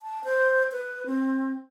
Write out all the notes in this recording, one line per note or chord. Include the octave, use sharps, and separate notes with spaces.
A5
C5
B4
C4